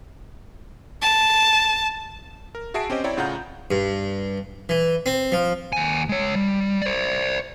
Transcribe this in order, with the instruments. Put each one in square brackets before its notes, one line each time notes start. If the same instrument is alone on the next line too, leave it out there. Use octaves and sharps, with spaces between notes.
[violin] A5
[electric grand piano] A#4
F#4 G#4 E5 A5 C7 D7
C4 C#4 G4 C5 D#5
C4 E4 C#5 D5 G5 A#5
A2 C#3 F4 F#5 A#5 G6
[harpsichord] G2
E3
C4
F3
[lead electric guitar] D#2 G#5
G#3 C#5
G3
C5 D5